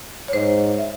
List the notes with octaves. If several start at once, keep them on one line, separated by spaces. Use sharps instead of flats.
C#5
G#2 C5
E5